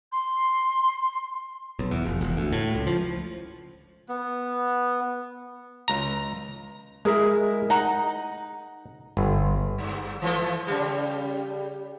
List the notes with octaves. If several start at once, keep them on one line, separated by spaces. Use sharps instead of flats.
C6
B1
E2
F1
E1
D2
A2
C#2
F3
B3
C#2 A#5
G#3 E4 G#4 A#4
D#4 F#5 A#5
G1
G2
E3 F3 A3
C#3 G3